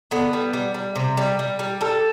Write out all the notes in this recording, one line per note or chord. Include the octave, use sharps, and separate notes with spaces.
D3 B3
G3
G3
G3
C3
G3
G3
G3
G3 A4